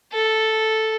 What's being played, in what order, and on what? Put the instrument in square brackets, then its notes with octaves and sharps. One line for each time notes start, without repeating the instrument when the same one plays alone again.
[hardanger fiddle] A4